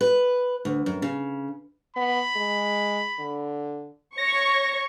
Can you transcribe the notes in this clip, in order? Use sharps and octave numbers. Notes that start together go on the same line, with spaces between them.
B4
D2
F#2
C#3
B3 B5
G#3
D3
C#5 C#6 A#6